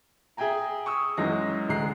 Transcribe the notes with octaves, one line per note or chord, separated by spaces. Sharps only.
G#4 E5 G5 G#5 A#5
C#6 D#6 E6
F#2 E3 F#3 G#3 D#4 A#6
D2 G#3 A#5 F#6 C7